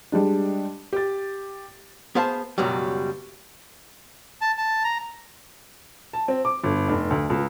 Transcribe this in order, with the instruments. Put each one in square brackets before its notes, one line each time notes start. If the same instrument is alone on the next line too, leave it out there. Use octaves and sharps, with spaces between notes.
[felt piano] G3 G#3 D4
G4 A6
[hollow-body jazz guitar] B3 G#4 C5 F5 A5
C#2 F#2 B2 F#3 G3
[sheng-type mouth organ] A5
A5
A#5
[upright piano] A5
C4
D6
G1
F1
D2
C#2